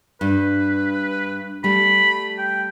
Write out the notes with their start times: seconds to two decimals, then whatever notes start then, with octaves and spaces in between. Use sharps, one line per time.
0.21 G2 B4
1.64 G3 A3 B5
2.38 G5